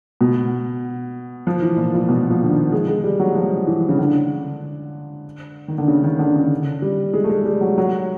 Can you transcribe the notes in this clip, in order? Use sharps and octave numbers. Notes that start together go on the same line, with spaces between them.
B2
F3
E3
A#2
A#2
B2
F3
D3
D#3
G#3
G#3
G3
F#3
F3
E3
C#3
D3
D#3
D3
C#3
D#3
D3
C#3
G3
G#3
A3
G#3
G3
F#3
F#3